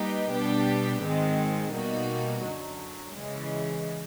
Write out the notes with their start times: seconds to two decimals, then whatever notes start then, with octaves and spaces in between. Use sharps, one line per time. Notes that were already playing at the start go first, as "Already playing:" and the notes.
Already playing: G3 A#3 D#4 G4 B4
0.31 B2 G3 B3 D4 G4
1.02 G#2 D#3 G#3 C4
1.73 B2 G3 A#3 D#4 F#4
2.44 F#2 D3 F#3
3.14 C#3 E3 G#3